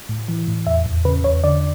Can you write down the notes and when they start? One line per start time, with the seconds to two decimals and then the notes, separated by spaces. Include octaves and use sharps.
0.09 A2
0.28 E3
0.48 A2
0.67 E2 E5
0.86 E2
1.05 C#3 B4
1.24 E2 C#5
1.44 D3 D5